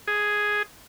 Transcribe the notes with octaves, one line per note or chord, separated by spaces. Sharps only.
G#4